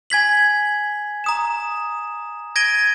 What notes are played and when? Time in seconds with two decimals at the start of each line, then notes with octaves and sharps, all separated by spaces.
0.10 G#5 G#6 B6 F#7
1.24 A#5 D#6 E7
2.56 G#6 A#6 D7 D#7 G7